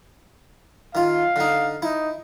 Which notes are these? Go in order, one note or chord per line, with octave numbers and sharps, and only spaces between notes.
D#3 F4 F5
D3 D#4
D#4 E4